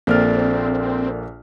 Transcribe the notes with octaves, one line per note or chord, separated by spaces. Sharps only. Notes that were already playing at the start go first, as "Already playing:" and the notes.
A#1 A#3 C4 A4 D5 F6 A6